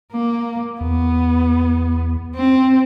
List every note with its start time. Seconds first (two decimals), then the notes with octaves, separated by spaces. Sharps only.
0.13 A#3
0.81 E2 B3
2.35 C4